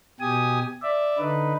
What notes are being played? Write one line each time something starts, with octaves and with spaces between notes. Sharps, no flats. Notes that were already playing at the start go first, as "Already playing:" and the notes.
B2 G4 G#5 D#6
D5 E5
D3 D#4 B4